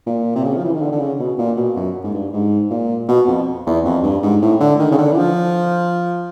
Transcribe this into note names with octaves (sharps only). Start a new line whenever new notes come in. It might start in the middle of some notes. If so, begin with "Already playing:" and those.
A#2
C3
C#3
F3
E3
D#3
D3
D3
C#3
B2
A#2
B2
F#2
G#2
G2
G#2
A#2
B2
F2
E2
F2
G2
G#2
A2
D3
D#3
C#3
D3
E3
F3